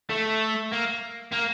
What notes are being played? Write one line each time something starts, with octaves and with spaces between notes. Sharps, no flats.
A3
A#3
A#3